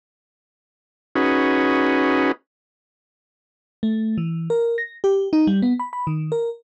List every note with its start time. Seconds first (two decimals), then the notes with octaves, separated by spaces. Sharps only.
1.16 C#4 D#4 F#4 G#4 B4
3.83 A3
4.18 E3
4.50 A#4
4.78 A#6
5.04 G4
5.33 D#4
5.47 G3
5.62 B3
5.80 B5
5.93 B5
6.07 D#3
6.32 A#4